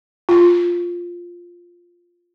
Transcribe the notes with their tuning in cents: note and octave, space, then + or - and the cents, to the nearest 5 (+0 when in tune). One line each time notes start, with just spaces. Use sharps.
F4 +0